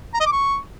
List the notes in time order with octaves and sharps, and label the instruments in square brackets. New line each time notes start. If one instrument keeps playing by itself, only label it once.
[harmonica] A#5
D#5
D6
C#6